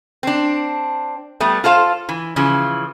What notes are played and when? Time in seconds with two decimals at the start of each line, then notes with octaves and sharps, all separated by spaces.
0.23 C4 D4
1.40 G3 A3 B3
1.64 F4 A4 C5 F5
2.09 E3
2.36 C#3 E3 F3